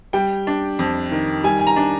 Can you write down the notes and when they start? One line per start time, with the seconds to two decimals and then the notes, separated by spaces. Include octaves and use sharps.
0.13 G3 G5
0.47 D4
0.79 F2
1.11 D#3
1.44 G3 G#5
1.59 G#5
1.67 A#5
1.76 D4